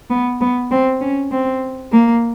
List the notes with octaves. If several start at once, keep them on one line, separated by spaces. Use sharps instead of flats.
B3
B3
C4
C#4
C4
A#3